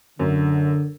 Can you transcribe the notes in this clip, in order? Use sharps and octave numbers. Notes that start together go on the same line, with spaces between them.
F#2 D3